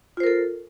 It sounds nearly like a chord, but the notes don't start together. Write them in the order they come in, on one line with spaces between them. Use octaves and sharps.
F4 C5 A#4 A4